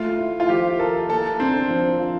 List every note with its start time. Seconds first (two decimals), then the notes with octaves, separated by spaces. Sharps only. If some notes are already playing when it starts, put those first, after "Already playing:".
Already playing: A3 F4
0.19 E4
0.40 F4
0.48 F3 G4
0.79 A4 A#4
1.09 A#3 A4
1.40 C4 D4
1.69 F3
1.99 F4